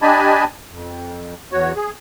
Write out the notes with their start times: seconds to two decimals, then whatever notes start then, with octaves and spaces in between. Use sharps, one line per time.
0.02 D4 G4 D#5 G#5 A5 B5
0.71 F2
1.52 E2 F#4 C#5
1.76 G#4